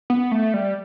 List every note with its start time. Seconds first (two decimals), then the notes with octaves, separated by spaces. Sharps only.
0.10 B3
0.32 A3
0.54 G3